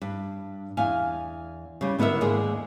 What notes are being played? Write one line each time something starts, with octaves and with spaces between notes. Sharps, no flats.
G2
E2 F5 G#5
C#3 G3
D3 B3 E4 A#4 E5
D#2 G#2 G#3 G#4 D5